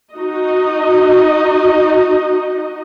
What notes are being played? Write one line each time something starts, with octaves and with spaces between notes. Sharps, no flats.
D#4 F#4 D#5